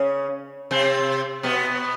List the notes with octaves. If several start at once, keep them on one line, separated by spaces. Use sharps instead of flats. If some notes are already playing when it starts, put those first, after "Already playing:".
Already playing: C#3 C#4
C3 C4
B2 B3